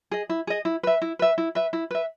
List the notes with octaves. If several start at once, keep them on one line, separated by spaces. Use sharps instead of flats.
G#4 D#5
E4
G#4 D#5
E4
B4 E5
E4
B4 E5
E4
B4 E5
E4
B4 E5